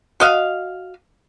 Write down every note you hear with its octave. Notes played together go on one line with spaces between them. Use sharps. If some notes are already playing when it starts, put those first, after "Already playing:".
F#4 D#5 F5